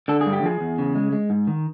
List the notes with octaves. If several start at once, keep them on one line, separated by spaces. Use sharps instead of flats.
D3 A4
G#4
G2
G4
F3 G#4
E2
C#3
G#3
G#3
G#2
D#3